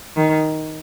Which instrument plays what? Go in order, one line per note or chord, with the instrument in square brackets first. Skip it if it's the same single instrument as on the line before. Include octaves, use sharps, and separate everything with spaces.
[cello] D#3